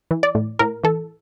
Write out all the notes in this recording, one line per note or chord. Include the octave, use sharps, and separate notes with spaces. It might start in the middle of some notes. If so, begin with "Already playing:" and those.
E3
D5
A2
A2 A#4
E3 A4